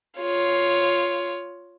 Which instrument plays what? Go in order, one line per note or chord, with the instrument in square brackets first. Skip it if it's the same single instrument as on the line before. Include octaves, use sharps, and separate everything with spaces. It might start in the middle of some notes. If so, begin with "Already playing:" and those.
[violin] F4 C#5